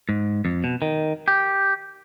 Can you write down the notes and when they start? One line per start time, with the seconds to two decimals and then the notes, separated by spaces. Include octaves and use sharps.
0.09 G#2
0.45 F2
0.64 B2
0.82 D#3
1.28 G4